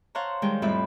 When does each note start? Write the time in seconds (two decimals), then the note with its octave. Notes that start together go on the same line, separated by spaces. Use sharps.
0.15 C5 C#5 F5 F#5 A5 A#5
0.42 D#3 G3 G#3 G5
0.62 F2 A2 G3 E5 B5